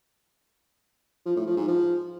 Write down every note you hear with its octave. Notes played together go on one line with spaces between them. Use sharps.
F3
A2
F3
G#2
F3